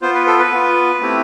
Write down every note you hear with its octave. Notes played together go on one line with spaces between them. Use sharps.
B3 F4 C5
B4
A4
B4
B3 F4
A3 C4 E4 G4